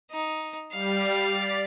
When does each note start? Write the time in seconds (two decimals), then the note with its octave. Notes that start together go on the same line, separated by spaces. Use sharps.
0.11 D#4
0.72 G3 F5
1.31 D5 A6 B6